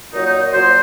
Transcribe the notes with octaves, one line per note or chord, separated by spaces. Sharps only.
A#2 F#3 D#4
D#4
A#2 F#3 C5